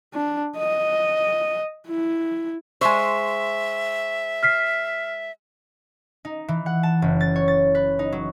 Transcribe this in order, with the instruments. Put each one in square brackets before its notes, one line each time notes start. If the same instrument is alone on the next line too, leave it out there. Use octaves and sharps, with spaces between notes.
[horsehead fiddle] D4
D#5
E4
[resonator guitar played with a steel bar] G#3 C5 [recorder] E5 [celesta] C#6
[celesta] F6 B6 C7
[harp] D#4
E3
F#5
A5
F#1
A6
C#5
A6
B4
D#4
F#3